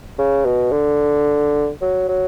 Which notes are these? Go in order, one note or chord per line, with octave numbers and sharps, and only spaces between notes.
C#3
B2
D3
F#3
F#3